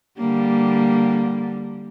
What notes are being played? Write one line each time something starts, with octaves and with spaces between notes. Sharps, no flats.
D3 G3 A#3